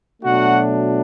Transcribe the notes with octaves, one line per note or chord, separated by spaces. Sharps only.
B2 F#3 A3 D4 F#4 F#5